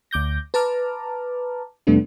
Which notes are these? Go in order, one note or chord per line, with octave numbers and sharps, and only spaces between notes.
D2 D6 G6 A#6
B4 A5 A#5 D6 F6
F2 C3 G3 A3 B3 D4